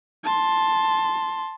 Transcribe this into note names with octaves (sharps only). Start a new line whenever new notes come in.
A5 C6